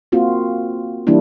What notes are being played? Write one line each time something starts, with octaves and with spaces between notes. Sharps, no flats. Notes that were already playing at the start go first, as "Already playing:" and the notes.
A#3 C4 F4 F#4
E3 G3 A#3 D4 E4